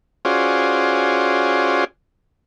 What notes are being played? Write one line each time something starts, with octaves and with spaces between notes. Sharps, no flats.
C#4 F4 F#4 G#4 C5 D5